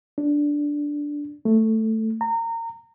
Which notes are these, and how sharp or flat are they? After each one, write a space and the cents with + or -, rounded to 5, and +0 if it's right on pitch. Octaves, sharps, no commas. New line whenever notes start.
D4 -5
A3 +5
A#5 -25